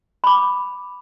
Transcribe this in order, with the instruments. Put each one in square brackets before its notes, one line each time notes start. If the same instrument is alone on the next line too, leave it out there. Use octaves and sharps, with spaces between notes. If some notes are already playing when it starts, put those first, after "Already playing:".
[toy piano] B5 D6